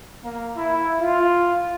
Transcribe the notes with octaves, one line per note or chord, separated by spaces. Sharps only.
A#3
E4
F4